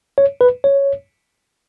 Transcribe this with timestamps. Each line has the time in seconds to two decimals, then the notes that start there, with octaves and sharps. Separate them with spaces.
0.18 C#5
0.41 B4
0.64 C#5